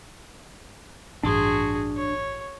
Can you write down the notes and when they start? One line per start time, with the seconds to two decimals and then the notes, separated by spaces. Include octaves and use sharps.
1.23 A1 G2 D4 F#4 G#4 C6
1.96 C#5